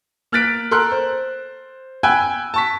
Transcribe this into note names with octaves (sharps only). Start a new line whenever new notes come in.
A#3 F6 F#6 A6 B6 D7
A4 A#4 C6 F#6
C5
G5 G#5 B5 E6 F#6 G#6
A5 C#6 B6